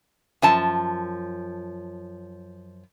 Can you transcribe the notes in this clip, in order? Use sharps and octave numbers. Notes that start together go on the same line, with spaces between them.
F#2 F3 A5